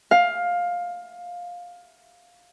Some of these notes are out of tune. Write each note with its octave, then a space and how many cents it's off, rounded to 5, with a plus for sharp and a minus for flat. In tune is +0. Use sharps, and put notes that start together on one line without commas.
F5 +15